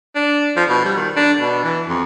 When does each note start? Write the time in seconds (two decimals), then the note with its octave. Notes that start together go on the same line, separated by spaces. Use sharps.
0.15 D4
0.56 F3
0.69 B2
0.85 G3
0.97 D#3
1.16 D4
1.40 B2
1.64 E3
1.89 F2